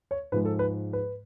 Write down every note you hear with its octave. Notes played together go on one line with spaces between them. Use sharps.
C#5
G#2 F3 G#3 B4
A4
B4
B4